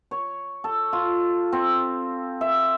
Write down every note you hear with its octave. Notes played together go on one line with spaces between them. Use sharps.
C#5
A4
F4
C4
E5